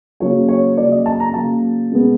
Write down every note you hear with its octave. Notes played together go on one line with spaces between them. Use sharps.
C#3 F#3 A#3 C#5
C#5
C#3 F#3 A#3 D5
D#5
A5
A#5
C#3 F#3 A#3 A5
B2 G#3 B3